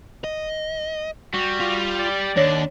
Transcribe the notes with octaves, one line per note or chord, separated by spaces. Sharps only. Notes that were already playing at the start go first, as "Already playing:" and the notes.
D#5
G3 F#4
F4
D5
D#2 D4 C#5 A#6